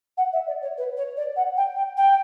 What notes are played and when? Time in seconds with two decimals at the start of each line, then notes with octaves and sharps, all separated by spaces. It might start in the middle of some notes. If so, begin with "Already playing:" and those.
0.17 F#5
0.32 E5
0.47 D5
0.62 C#5
0.77 B4
0.96 C#5
1.17 D5
1.36 F#5
1.57 G5
1.76 G5
1.97 G5